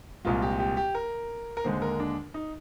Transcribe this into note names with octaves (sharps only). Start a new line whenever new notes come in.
C2 A#2 G#3 F4
G4
G4
G4
A#4
A#4
D#2 D3 G#3 C5
A#4
D4
D#4